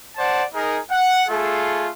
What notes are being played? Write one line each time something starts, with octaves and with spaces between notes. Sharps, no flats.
C5 D5 F#5 A5
D#4 G#4 A#4
F#5
A3 F4 G#4 A4